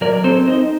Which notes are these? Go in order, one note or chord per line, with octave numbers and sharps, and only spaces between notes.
F#3 A#4 D5
C4 A4 C5
D#4 C5 D#5